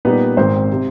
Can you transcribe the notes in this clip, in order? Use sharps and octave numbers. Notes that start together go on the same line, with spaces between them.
A#2 G3 B3 D#4 B4
G#1 G#2 D#3 C4 C5
C3